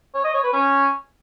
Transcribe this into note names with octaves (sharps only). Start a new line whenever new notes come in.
C#5
D#5
C#5
B4
C#4